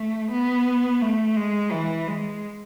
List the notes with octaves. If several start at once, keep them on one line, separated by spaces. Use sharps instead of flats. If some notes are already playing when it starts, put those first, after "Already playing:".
Already playing: A3
B3
A3
G#3
E3
G#3